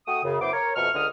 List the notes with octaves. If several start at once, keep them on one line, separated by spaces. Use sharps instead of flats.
A3 F#4 G5 D#6
F#2 C#3
F#2 B3 E4 C5 D6
A#4 C#5
F2 B2 A3 C#6 F6
C#2 D3 D#5 D#6 F6